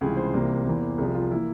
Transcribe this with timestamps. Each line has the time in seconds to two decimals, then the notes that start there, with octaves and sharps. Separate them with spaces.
0.01 C#2 C3 E3 G3 G#4
0.17 C5
0.33 C2 C3 E3 A#3
0.66 E2 E3 A#3
0.98 C2 C3 F3 G#4
1.15 F4
1.31 E3 A#3 E4